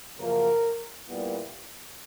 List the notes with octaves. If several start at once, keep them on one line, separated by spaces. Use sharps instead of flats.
F#2 C#3 F3 A#3 A#4
A#2 G3 B3 E4